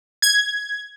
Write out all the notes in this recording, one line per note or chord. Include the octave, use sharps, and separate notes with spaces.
G#6